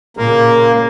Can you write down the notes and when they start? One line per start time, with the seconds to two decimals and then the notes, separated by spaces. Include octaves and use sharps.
0.17 A#2 C#3 A#3